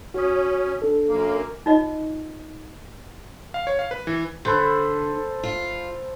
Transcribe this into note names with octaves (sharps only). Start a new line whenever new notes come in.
C#4 F#4 D#6
D4 A4
F#2 A#3
D#4 F4 D#5
F5
C#5
F5
B4
E3
D3 A4 B4 C5
F4